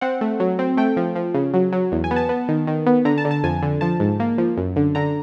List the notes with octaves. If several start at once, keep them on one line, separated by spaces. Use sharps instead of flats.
C4 F#5
A3
F#3
C4
A3 G5
F3
F3
C#3
F#3
F#3
E2
G#5
B3
A5
B3
D#3
D#3
B3
D3 A#5
A5
D3
A5
F2 G#5
D3
F3 A5
G#2
A#3
F3
F#2
D3
D3 A#5